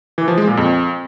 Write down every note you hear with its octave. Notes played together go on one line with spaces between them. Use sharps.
E3
F3
G#3
A#2
F2